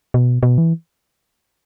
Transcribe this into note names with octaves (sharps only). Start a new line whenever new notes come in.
B2
B2
E3